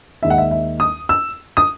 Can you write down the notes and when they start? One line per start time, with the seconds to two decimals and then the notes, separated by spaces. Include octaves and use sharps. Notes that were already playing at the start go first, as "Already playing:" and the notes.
0.23 D#2 D#3 G#3 E5
0.30 F#5
0.38 E5
0.51 E5
0.80 D#6
1.09 E6
1.57 D#6